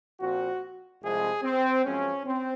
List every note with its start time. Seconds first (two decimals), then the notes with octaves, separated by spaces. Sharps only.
0.20 A#2 F3 C4 F#4
1.02 C2 C3 F3 G#3 G#4
1.43 C4
1.84 F#2 F3 G#3 C#4
2.25 C4